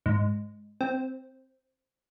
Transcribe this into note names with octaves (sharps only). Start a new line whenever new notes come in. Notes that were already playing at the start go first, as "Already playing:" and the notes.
G#2
C4